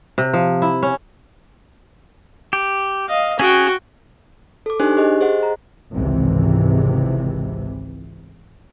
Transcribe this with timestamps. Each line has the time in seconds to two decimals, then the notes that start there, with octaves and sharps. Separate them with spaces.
0.18 C3
0.34 F3
0.62 E4
0.83 C#4
2.53 G4
3.08 D#5 F5
3.39 C#4 F#4 G#4 G5
4.66 A4 D6
4.80 D4 D#4 G4 C5 G#5 F#6
4.97 G4 G#4 D#5
5.21 G#4 C5 D#5 F#5
5.43 A#5
5.94 G#1 C#2 C3 E3